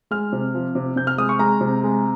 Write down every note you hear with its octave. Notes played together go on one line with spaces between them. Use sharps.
G#3 F6
C3
F3
C3
C3 G6
F6
G#3 D#6
C#6
G#3 A#5
C3
G#3